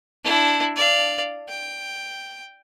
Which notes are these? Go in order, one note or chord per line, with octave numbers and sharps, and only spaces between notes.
D4 E4
D5 F5
G5